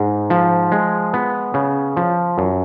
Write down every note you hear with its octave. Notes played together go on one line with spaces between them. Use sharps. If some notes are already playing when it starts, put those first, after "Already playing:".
Already playing: G#2
F3
G#3
B3
C#3
F3
F#2